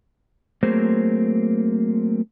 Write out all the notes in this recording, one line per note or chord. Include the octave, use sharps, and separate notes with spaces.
F#3 A3 A#3 C4 G#4 C5